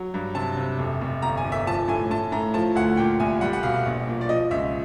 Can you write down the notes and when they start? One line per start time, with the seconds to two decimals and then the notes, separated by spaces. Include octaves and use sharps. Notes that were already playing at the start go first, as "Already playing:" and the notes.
Already playing: F#3
0.14 G2
0.35 C3 A5
0.57 C3
0.79 F1
1.01 F1
1.22 G1 A#5
1.37 G#5
1.45 G1
1.52 E5
1.66 F3 A5
1.88 A2 G#5
2.11 A2 A5
2.32 A2 A#5
2.54 F3 A5
2.75 D2 F#5
2.97 A#2 G5
3.20 C2 G#5
3.41 G3 F#5
3.53 F#5
3.63 B2 F5
3.86 A#1
4.07 A#2
4.21 D5
4.29 F3 D#5
4.51 C#2 E5